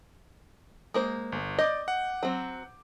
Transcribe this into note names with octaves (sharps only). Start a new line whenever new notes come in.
G#3 A#3 C5
G1
D5 D#5 D6 G6
F#5
F#3 C4